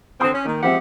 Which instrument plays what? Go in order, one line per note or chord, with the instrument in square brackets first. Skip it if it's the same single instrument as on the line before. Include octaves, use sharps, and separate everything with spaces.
[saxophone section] D3 C4 [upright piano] C6 D#6 G6
[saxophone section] C#4
[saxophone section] D#3 [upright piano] A#3
[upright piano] F3 C4 E5 [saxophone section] G#3 G4 F#5